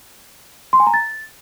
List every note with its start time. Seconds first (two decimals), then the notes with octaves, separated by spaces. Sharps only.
0.73 C6
0.80 G#5
0.87 A#5
0.94 A6